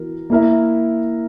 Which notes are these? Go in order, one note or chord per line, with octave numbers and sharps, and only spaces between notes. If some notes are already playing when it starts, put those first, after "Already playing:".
Already playing: E3 B3 F#4 A#4
A#3 E4 A#4 E5